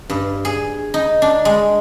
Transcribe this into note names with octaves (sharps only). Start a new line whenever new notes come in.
G2
G#4
D#4
D4
G#3